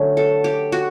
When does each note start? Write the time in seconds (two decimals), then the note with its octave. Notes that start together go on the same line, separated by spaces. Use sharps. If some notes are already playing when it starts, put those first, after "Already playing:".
Already playing: D3 F#3 A3 C#4
0.17 A4
0.44 G4
0.72 F#4